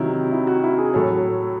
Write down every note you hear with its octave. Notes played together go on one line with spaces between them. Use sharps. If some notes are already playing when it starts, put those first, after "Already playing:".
Already playing: C3 D#3 F#3 E4
E4
F#4
E4
G#4
A2 F#3 A4